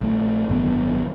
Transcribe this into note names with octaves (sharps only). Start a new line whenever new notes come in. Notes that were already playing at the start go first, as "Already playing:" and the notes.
A#1 A3
G#1 F#2 D3 B3